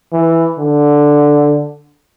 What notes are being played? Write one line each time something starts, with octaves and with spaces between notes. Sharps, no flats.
E3
D3